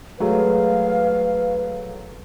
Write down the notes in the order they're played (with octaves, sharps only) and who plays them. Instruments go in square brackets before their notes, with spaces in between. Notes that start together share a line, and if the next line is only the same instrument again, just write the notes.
[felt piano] F#3 G#3 A3 [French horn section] B4 [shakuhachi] F5